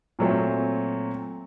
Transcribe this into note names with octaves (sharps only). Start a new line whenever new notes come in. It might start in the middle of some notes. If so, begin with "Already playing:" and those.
A#2 F#3 A3 C4